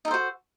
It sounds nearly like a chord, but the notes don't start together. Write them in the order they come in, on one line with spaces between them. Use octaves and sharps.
D#4 A4 C5 F#4